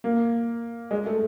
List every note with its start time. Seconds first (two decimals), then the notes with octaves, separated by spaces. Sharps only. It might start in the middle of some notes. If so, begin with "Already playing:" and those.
0.04 A#3
0.91 G#3
1.06 A3